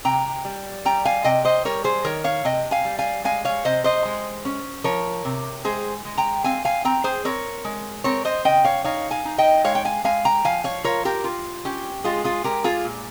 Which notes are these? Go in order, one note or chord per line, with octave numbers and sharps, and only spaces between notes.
C3 G5 A#5
G3
G3 G5 A#5
F5 G#5
C3 D#5 G5
C5 D#5
G3 A#4 C#5
G#4 C5
D#3 A#4 C#5
C#5 F5
C3 D#5 G5
F5 G#5
G3
F5 G#5
G#3 F5 G#5
C#5 F5
C3 C5 D#5
C5 D#5
G#3
C#4
F3 A#4 C#5
C3
G#3 G#4 C5
G#3
G5 A#5
C4 F5 G#5
F5 G#5
C4 G5 A#5
G#4 C5
C4 A#4 C#5
G#3
C4 A#4 C#5
C5 D#5
C#3 D#5 G5
C#5 F5
D#4 C#5 F5
F5 G#5
D#4
D#5 G5
G#3 C#5 F5
G5
F5 G#5
G#3 F5 G#5
G5 A#5
F3 F5 G#5
C#5 F5
F4 A#4 C#5
G4 A#4
F4
C#4 G4
G#3 F4 G#4
F4 G#4
G#3 G4 A#4
F4 G#4
A#2